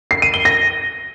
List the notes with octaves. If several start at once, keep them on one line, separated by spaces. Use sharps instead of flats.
C7
D#7
G7
A#6